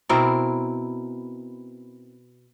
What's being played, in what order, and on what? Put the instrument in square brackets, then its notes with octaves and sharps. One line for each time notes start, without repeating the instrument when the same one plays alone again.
[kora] B2 C4 E4 A#4